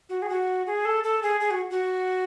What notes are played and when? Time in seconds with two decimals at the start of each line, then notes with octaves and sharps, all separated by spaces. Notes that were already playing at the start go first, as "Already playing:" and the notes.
0.09 F#4
0.22 G#4
0.29 F#4
0.67 G#4
0.85 A4
1.04 A4
1.23 G#4
1.40 G#4
1.51 F#4
1.71 F#4